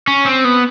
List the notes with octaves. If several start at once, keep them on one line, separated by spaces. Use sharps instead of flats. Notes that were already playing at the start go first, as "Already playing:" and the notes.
C#4
C4
B3